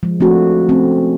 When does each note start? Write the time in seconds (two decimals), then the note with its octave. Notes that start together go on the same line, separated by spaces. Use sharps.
0.03 F3 G#3
0.20 F3 A3 C4 D4 F#4
0.69 A3 C4 C#4